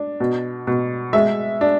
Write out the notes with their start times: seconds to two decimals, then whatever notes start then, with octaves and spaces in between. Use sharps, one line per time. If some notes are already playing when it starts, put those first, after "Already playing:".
Already playing: D4
0.20 B2
0.67 B2
1.13 G#3 E5
1.61 D4